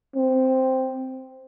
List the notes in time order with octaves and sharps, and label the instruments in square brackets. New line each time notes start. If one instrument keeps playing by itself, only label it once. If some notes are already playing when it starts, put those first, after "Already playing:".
[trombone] C4